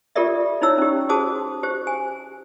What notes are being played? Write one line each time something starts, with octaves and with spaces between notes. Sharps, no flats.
F4 G4 A4 A#4 D5 E5
D#4 E4 C#5 A#5 E6
C#4 G4
F#4 G#4 C5 A5 D#6
G4 C5
G#5